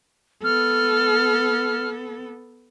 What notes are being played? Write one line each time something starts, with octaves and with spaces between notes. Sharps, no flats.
B3 A4 F6